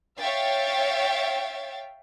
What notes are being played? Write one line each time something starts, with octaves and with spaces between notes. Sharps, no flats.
C#5 E5 F5 G5 A6